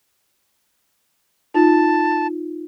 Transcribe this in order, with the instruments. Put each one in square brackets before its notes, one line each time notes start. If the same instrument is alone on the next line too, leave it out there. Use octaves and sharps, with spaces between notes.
[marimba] D#4 F4 [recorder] A5